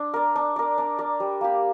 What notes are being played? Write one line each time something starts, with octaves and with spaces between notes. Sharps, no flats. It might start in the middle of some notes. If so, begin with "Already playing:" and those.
Already playing: D4
A#4 D5
D4
A#4 D5
D4
A#4 D5
G3
A#3 G4